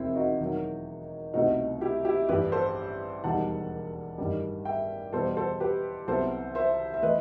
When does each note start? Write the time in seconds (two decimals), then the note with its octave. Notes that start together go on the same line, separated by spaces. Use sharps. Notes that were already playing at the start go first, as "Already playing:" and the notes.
Already playing: E1 D#2 D#3 C4 E4
0.15 D#4 F#4
0.40 E1 E2 D#3 F#3
1.34 C2 B2 A3 C4 D#4 F#4
1.81 E4 G4
2.05 E4 G4
2.29 A1 G2 E3 G4 B4
2.52 A4 C5
3.24 E1 D#2 D#3 G3 F#5 A5
4.18 A1 G2 D#3 G3
4.65 E5 G5
5.13 E2 B2 G3 B3 A4 C5
5.37 A4 C5
5.60 G4 B4
6.07 C2 C3 F#3 B3 A4 C5
6.55 C5 E5
6.94 E5
7.02 E3 A3 B4 D#5